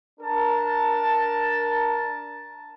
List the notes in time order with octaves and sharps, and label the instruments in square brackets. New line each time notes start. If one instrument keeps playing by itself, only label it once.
[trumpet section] D4 A#4 A5